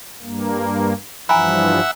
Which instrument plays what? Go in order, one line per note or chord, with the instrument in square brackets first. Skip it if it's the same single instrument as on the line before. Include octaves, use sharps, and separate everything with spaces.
[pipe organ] G2 A#3
[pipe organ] G2 E3 F3 [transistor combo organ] E5 F#5 [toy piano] G#5 A#5 B5